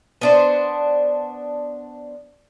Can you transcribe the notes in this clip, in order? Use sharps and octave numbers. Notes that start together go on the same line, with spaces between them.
B3 D4 C5